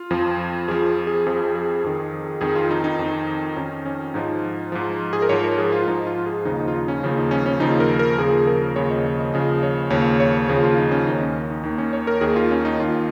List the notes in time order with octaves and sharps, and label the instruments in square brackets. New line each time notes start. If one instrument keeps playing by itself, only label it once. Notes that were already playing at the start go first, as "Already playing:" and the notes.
Already playing: [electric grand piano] F4
F2 F3
F2 F3 G#4
G#4
F2 F3 G#4
G#4
F2 D#3
F2 D#3 G#4
F4
D#4
D#4
F2 D#3
F2 D#3 C#4
C#4
G#2 F3 D#4
G#2 F3
G#4
A#4
G#2 F3 C#5
A#4
G#4
F4
G#2 F3 D#4
F4
G#4
D#2 C#3 F3 D#4
D#4
F4
D#4
C#4
D#2 C#3 F3
D#4
C#4
C#4
D#2 C#3 F3 D#4
A#4
A#4
D#2 C#3 F3 G#4
A#4
D#2 C#3 F3 C#5
D#5
C#5
D#5
D#2 C#3 F3 D#5
C#5
D#2 C#3 F3 C#5
C#5
D#2 C#3 F3 G#4
F4
D#4
C#4
D#2 D#3 D#4
C#4
D#4
D#2 D#3
C#4
C#5
A#4
D#2 D#3 G#4
F4
C#4
D#4
D#2 D#3 F4